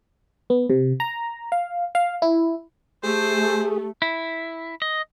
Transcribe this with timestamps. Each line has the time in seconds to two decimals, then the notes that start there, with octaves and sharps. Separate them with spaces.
0.50 B3
0.70 C3
1.00 A#5
1.52 F5
1.95 F5
2.22 E4
3.04 A3 G4 G#4 C5
4.02 E4
4.82 D#5